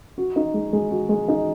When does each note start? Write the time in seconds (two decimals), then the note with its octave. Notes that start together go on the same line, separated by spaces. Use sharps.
0.18 F#4
0.36 D#4
0.54 G#3
0.73 G#3
0.91 F#4
1.09 G#3
1.28 D#4